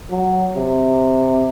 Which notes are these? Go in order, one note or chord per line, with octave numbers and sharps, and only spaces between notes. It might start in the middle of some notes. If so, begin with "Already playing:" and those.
F#3
C3